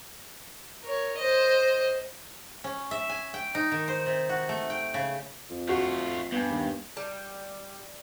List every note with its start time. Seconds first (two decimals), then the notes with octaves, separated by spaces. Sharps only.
0.83 A#4 C#5
1.18 C5 D#5
2.64 C#4
2.91 E5
3.09 G#5
3.34 G5
3.55 D#4
3.72 D#3
3.88 C5
4.06 C3
4.29 F#4
4.49 A3
4.70 G5
4.94 C#3
5.50 F2
5.69 A3 F4 F#4
6.32 G2 B3 G#5
6.50 D#2
6.97 G3